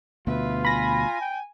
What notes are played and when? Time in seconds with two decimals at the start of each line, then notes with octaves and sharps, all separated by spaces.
0.27 D2 B2 F4 B4 E5
0.65 G#5 B5 A#6
1.21 G5